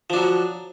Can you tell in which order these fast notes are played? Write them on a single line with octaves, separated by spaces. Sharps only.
F3 D4 F#3